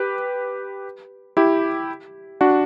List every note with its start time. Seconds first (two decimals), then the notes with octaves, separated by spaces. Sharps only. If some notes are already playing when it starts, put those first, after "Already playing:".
Already playing: G4 B4
1.37 E4 G4
2.41 D4 F#4